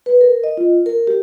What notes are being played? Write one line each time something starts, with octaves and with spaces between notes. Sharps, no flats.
B4
A#4
D#5
F4
A#4
G4